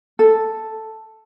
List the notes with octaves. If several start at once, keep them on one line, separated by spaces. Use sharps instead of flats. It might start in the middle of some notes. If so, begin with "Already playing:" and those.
A4